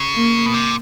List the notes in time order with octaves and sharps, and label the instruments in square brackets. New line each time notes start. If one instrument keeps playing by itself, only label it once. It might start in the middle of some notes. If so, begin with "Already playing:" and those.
Already playing: [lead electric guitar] C#3
[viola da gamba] A#3
[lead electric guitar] B2
C3